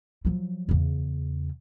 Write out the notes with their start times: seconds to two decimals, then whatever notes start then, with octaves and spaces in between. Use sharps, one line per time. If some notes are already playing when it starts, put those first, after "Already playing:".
0.25 F3 F#3
0.69 E2 C#3